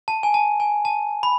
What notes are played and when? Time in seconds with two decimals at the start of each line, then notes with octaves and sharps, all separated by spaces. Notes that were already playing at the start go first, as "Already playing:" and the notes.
0.08 A5
0.23 G#5
0.34 A5
0.60 G#5
0.85 A5
1.23 B5